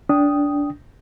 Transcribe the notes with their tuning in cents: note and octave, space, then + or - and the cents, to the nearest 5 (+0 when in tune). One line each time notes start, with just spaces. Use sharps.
D4 -20 G5 +0 D#6 +0